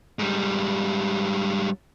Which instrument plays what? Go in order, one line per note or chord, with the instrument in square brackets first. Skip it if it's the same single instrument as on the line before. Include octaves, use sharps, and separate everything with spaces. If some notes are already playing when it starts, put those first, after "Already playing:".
[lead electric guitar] G#2 G3